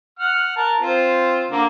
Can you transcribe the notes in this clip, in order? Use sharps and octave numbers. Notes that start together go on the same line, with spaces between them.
F#5 F6
A#4 A5
C4 F4 C5
D3 A#3